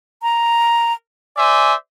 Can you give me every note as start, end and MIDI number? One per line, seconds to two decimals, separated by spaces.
0.22 0.93 82
1.37 1.73 72
1.37 1.73 74
1.37 1.73 76
1.37 1.73 80